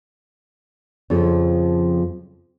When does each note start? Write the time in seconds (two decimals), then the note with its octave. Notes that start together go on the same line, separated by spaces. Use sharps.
1.10 F2 C#3 F3